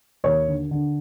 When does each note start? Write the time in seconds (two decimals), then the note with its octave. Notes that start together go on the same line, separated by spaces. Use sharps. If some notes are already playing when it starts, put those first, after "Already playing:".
0.24 D#2 C#5
0.47 D3
0.71 D3